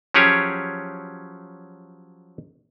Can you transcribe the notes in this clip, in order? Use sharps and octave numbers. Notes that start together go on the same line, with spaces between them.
F3 F#3 C#4 G4 G#4 C#5